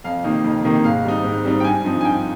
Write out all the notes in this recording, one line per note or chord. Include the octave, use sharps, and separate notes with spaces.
F2 F5
C3 D#3 A#3 D#4
F2
C3 D#3 A#3 D#4
G#2 F5
G3 C4 D#4
G#2
G3 C4 D#4
G5
G2 G#5
F3 C4 D#4
G#5
G2 G5